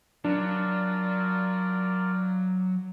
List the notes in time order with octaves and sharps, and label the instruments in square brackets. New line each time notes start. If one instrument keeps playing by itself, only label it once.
[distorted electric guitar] F#3 [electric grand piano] D4 [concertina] F4 A#4 D5